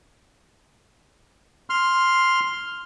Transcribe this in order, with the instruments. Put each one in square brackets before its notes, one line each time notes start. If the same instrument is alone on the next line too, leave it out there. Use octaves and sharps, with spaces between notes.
[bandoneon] C6 F6